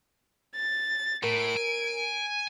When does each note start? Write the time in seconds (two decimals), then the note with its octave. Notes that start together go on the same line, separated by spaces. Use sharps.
0.55 A6
1.24 A2 A#4 D7
1.57 G#5